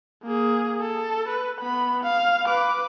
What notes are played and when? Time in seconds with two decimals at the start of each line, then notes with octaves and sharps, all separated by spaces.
0.23 A#3 G#4
0.81 A4
1.28 B4
1.60 B3 B5
2.04 F5
2.45 B4 D6